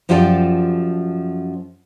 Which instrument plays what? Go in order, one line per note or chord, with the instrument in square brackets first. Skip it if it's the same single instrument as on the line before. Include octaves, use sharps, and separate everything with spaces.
[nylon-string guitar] F#2 F3 F4 G4 A4 D5